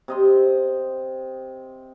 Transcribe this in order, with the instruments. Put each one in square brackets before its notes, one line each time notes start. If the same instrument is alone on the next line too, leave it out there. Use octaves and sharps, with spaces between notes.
[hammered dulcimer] C3 D#5 C6